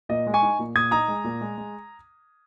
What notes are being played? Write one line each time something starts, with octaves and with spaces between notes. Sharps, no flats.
A#2 D#5
G#3
G#5 C#6
D#4
A#2
A#2 D#6 G#6
D#4 A#5 D#6
G#3
A#2
G#3
G#3